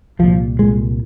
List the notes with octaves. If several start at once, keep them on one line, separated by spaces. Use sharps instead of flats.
C2 A#2 F3
C2 A#2 G#3